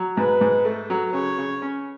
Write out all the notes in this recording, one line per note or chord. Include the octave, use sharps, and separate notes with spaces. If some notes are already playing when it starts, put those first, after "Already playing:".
Already playing: F#3
G#2 B4
G#2
A3 A4
F#3
C#3 C#5
C#3
C#4